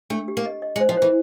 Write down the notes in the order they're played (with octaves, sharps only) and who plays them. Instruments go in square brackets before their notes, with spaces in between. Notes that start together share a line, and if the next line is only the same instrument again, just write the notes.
[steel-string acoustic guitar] A3 [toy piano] D4
[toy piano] G4
[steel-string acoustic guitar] A#3
[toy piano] D#5
D#5
[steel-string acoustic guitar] G#3
[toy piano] C5
[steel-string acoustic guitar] F3
[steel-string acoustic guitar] E3 [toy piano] C5